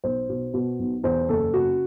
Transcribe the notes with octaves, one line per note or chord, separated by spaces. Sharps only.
B1 C5
B2
B2
B1
E2 C5
F#1 A4
C#3 F#4